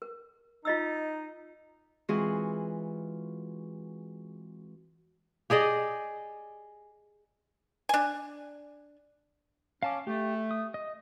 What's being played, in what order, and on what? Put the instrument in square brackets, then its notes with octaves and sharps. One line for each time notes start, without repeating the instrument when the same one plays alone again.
[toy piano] A#4
[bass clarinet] D#4 [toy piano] F4 D#5 E6
[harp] E3 G#3 C4 F4 F#4 G#4
[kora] G4 G#4 D5 D#5
[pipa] D4 G#5
[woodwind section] C#4 [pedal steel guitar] F5 A5 D6
[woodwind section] A3 [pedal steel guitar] G4
[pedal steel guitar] D#6
D#5